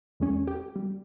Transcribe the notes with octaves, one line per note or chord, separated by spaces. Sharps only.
E2 G#3 C#4
G4
G3